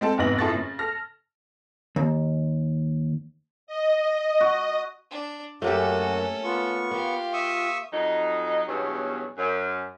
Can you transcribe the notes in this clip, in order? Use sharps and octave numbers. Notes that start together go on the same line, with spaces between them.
G#3 C4 A4
F1 E2 G#2 B4 A#6 F#7
F#2 E4 F4 A4 C#6 A6
C#3
A4 F6 A#6
D#2
D#5
F#4
D4
F#2 A3 A#3 C#4 F#4 G4 A4
B3 F4 C#6
A#3 G4 F5
E5 C#6 D#6
F2 F#3 D#4
E2 G2 B2 F#3 C#4
F#2